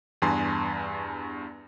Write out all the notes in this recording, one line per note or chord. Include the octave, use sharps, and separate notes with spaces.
E2 G2 G#5 A5 C6